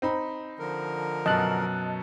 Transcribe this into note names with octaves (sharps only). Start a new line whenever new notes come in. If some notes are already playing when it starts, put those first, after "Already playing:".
C4 D#4 B5
D3 F3 A#4
F#2 B2 D#5 A5 F#6